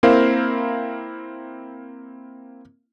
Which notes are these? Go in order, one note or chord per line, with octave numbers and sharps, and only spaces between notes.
A#3 C4 E4 A#4 C5 F5